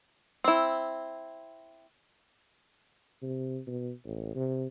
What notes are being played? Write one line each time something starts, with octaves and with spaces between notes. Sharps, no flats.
C4 E4
C3
B2
A1
C3